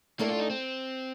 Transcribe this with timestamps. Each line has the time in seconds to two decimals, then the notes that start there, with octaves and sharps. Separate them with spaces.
0.19 A2 A3 A#3 D4 A4 D5
0.30 F4
0.40 D#4
0.50 C4